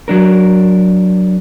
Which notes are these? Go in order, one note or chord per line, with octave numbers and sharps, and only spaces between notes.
F#3 D4 A#4